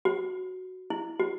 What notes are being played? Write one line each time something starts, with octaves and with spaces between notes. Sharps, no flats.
F#4
E4
F#4